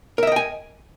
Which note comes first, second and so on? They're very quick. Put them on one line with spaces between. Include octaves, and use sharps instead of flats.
A#4 E5 D#5 G5 G#5